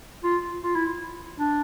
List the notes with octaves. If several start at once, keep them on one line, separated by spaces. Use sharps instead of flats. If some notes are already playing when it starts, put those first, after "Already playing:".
F4
F4
E4
D4